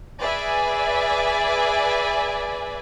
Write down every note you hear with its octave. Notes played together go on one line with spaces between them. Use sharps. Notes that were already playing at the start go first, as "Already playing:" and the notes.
G#4 B4 D5 E5 G#5